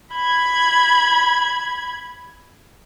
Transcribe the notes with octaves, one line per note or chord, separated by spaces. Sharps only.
B5 G#6